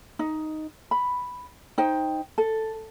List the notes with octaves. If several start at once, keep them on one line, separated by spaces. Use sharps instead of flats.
D#4
B5
D#4 C5 G5
A4